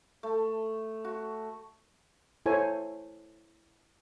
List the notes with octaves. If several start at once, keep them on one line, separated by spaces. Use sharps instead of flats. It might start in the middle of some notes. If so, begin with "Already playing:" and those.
A3
F#4
E4 A4 C5 C#5 G#5